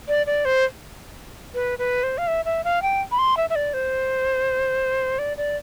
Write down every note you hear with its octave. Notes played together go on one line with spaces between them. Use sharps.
D5
D5
C5
B4
B4
C5
F5
E5
E5
F5
G5
B5
C6
E5
E5
D5
C5
D5
D5